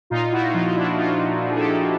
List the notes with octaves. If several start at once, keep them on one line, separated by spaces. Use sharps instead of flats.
A#2 D#4 F4
E4 F#4
F3 D#4 F4
D4 E4
A#2 D#4 F4
F3
G#4
G4 A4